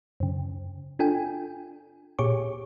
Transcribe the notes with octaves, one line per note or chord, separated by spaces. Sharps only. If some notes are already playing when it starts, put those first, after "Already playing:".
F#2 C#3
D4 F4 A4 G5 G#5
A#2 G4 G#4 C#5 C#6 D6